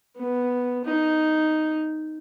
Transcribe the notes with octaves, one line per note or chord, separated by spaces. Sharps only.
B3
D#4